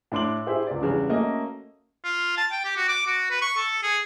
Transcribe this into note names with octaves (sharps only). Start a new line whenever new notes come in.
A2 D4 C6 D6 F#7
E4 G4 G#4 C5 E5
C#2 D5
E2 C#3 G3 D4
A3 A#3 C#4 F#4 D#5
F4
A5
G5
G4
F#4
D6
F#4
B4
C#6
A4
G#4